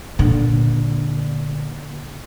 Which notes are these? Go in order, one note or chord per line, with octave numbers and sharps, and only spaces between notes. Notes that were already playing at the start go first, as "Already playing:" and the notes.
A#2 D3